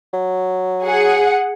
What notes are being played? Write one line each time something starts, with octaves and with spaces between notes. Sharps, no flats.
F#3
G#4 F#5